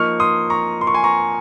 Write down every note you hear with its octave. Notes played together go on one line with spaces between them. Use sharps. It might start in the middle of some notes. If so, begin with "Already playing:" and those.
Already playing: F3 A#3 D#4 C#6 F6
C6 D#6
A#5 C#6
C6
C#6
G#5 C6
A#5 C#6